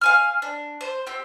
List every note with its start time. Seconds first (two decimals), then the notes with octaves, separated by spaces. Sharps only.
0.01 F5 G#5 F6
0.42 D4
0.81 C5
1.07 C4 G4